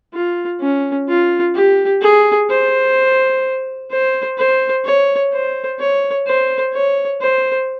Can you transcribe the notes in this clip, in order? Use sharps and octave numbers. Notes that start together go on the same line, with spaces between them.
F4
C#4
F4
G4
G#4
C5
C5
C5
C#5
C5
C#5
C5
C#5
C5